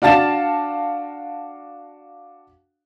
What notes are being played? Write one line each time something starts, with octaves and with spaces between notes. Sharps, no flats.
D4 F#4 F5 A5 A6 E7